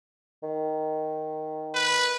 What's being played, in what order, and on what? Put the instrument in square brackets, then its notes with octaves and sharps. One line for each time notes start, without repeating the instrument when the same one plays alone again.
[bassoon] D#3
[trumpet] B4